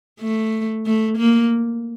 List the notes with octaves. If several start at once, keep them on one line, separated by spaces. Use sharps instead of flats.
A3
A3
A#3